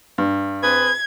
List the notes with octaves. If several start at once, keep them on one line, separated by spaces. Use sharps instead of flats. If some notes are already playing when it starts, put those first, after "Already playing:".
G2
C4 G#4 B4 G#6